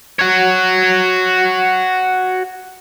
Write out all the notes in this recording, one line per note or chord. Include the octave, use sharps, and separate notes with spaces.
F#4 C#5